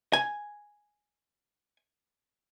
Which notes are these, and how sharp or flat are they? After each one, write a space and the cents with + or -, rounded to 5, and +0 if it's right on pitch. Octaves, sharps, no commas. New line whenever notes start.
G#5 +0